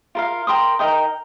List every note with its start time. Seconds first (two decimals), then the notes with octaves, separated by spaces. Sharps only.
0.15 F4 A#4 F5
0.47 A#4 G5 C6 D#6
0.79 D#4 A#4 D#5 G5